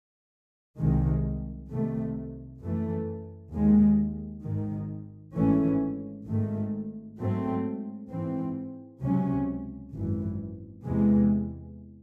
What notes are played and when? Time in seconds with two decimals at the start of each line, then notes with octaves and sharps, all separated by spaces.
0.77 C2 C3 D#3 G#3
1.68 C2 C3 D#3 A3
2.60 F#2 E3 A3
3.52 D#2 D#3 G#3
4.44 G#1 G#2 D#3
5.36 G#1 G#2 E3 A3 C#4
6.27 G#1 G#2 D#3 A3
7.18 G#2 F#3 A3 C4
8.10 G#2 E3 C4
9.02 C#2 C3 F#3 C#4
9.94 G#1 F#2 E3
10.85 E2 C3 E3 G#3